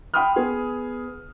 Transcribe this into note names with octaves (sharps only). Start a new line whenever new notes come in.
F#5 G5 B5 C6 D#6 F6
B3 G#4